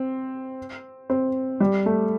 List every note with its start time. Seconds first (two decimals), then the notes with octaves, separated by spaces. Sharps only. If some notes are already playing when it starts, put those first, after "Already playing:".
Already playing: C4
1.10 C4
1.61 G3
1.86 A3